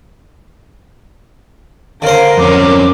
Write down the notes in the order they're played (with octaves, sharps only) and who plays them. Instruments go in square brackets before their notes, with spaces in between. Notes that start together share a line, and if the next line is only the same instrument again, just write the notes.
[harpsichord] D3 C5 [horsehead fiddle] A#4 [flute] F5
[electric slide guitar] F2 C#4 [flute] D6